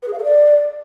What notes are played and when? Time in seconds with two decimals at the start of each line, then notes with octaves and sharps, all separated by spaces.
0.02 B4
0.08 G#4
0.13 F5
0.18 A4
0.23 D5